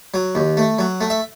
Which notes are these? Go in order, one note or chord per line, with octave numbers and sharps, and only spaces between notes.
F#3
D#2
A3
F#3
A3
E5